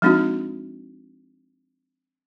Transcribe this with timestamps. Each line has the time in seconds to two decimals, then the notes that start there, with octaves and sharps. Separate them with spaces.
0.02 F3 G#3 C4 D4 D#4 F#4